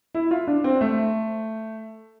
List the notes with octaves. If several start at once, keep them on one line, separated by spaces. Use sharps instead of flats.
E4
F4
D4
C4
A3